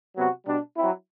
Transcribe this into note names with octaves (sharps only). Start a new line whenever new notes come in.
C3 F#3 B3 F#4
B2 G3 D4
F#3 C4 E4